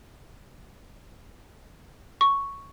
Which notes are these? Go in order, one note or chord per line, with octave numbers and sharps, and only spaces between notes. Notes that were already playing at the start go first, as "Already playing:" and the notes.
C#6